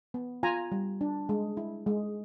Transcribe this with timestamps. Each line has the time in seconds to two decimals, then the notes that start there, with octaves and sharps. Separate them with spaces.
0.14 B3
0.43 F4 G#5 A#5
0.72 G3
1.01 D4
1.29 G#3
1.57 E4
1.87 G#3